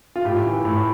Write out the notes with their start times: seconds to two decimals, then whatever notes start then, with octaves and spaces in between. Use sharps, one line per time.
0.16 F4
0.25 A2 G4
0.46 E3
0.65 A2